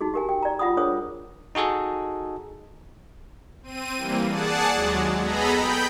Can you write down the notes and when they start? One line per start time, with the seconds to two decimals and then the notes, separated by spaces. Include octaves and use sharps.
0.01 D#4 F#4 G#4
0.14 G4 A#4 G#5
0.29 G5
0.42 D5 A#5
0.59 F4 F#5 B5 D#6
0.77 D4 G#4 A#4 C5 C#5 D#6
1.55 D#4 F#4 G#4 A4
3.63 C4 D#7
3.97 E3 G3 A#3
4.29 G#4 D5 F#5 A5
4.72 D#2 F#3 G#3
5.20 B3 G#4 A4 D#5 A#5 B5
5.55 G5 B5 G6